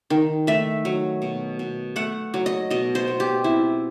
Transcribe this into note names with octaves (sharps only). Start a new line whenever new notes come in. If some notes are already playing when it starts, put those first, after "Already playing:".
D#3
A3 E5
F#3
B2
B2
A3 F#5
F#3
D#5
B2 D#5
C5
B2
G4
C4 E4